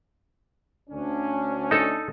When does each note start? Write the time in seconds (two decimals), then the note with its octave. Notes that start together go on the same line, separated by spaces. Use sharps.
0.90 D2 C#4 D4
1.71 D#4 A4